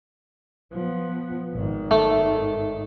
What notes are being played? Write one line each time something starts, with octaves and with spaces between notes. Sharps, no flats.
F3 B3
G#1 D#3
A3